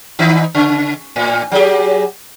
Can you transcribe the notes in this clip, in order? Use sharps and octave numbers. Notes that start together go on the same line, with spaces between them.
D#3 D#4
C#3
A2
F#3 G4 G#4